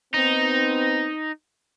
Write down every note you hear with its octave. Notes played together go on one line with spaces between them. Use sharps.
B3 C4 D#4